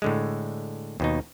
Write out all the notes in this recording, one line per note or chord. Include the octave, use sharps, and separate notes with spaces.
A2 D3 G#3
D#2 B2 D#4